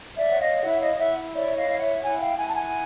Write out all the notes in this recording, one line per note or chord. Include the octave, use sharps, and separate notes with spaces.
D5 E5
C#5 F#5
D#5 F5
E4 E5 F#5
D#5 F5
E4 E5 F#5
C#5 D5 E5
D#5 F5
E4 F5
E5 F#5
E4 F#5 G#5
F5 G5
E4 F#5 G#5
A5
F#5 G#5